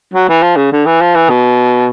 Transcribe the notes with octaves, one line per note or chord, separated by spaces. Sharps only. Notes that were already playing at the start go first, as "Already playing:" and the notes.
F#3
E3
F3
C#3
D3
E3
F3
E3
B2